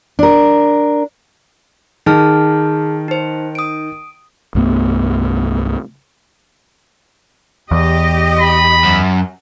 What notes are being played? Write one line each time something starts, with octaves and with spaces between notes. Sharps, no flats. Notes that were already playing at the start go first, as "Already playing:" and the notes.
D4 A#4
D#3 G#4 A5 F6
D#4 C5
D#6 D7
C2 G2 A3 B3
E2 G4 D#5
B5
F#2